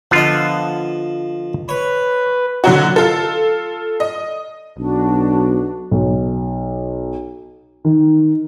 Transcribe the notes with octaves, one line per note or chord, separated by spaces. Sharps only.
D3 F3 B3 F4 D#5
B4 C#5
D3 E3 F#3 F#4
F4 A4
D#5
B1 D4 F#4
B1
D#3